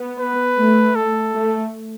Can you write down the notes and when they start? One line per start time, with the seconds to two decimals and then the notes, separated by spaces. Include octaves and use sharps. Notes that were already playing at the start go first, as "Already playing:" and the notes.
Already playing: B3
0.19 B4
0.58 A3
0.96 A4
1.34 A3